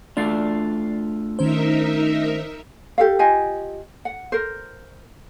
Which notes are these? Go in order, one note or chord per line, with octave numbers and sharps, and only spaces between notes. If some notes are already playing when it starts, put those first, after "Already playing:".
A3 D4 F4 D5 A6 C7
D#3 C#4 D#4 A#4 C5 E5
G4 A4 F5
F4 G4 D#5 G#5
F#5
A#4 C5